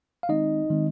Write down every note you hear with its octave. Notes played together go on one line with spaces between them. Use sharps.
F5
D#3 G#3 C4 D#4 D#5
D#3 G#3 C4